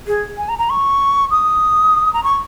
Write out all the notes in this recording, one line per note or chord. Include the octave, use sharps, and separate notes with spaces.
G#4
G#5
A#5
A#5
C#6
D#6
A#5
C#6